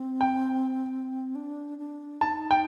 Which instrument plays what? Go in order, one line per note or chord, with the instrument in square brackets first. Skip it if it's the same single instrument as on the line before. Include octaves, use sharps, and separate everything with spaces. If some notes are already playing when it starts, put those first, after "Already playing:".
Already playing: [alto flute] C4
[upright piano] G5
[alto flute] D4
D4
[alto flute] D#4 [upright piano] A5
[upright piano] G5